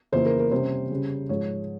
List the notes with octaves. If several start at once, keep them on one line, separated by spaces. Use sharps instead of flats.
F2 C#3 E3 A#3 C5
A#4
A#4
C3 G3 C#4 C5
C#3 G3 C#4
G#2 F3 G#3 C#5